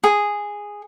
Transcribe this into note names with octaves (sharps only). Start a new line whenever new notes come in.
G#4